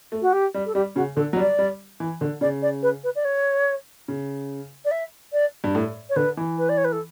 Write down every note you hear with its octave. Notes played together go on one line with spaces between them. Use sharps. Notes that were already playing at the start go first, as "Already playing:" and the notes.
A3
F#4
G4
G3
A4
G3 G4
C#3 F#4
D3 A4
F#3
G3 D5
G3
E3
D3
C#3 D5
D5
B4
B4
D5
C#5
C#3
D5
E5
D5
G2
A2
C#5
D3 B4
E3
B4
D5
C#5
B4
A4